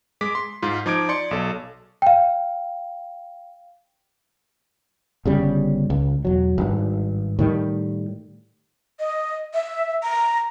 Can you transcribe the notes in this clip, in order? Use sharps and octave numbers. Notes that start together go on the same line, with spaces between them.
G#3 D6 B6
C6
G#2 F4
F3 D#4 D6 G#6 D7
D5 C6 C#7
B1 A4
F5 G5
G1 C#3 G3
C#2
E1 F#3
G#1 G2
A2 D#3 G3
D#5
E5
A#5